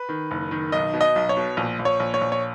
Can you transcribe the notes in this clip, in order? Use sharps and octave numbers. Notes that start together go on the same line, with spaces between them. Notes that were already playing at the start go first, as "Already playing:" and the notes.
Already playing: B4
D#3
F#1
D#3
B1 D#5
B2
D#5
B1
C#5
B2
A#1
A#1
C#5
A#1
C#5
A#1
C#5